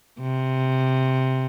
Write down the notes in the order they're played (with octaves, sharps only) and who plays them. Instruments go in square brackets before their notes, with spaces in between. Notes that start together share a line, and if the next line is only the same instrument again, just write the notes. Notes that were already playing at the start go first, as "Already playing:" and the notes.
[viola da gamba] C3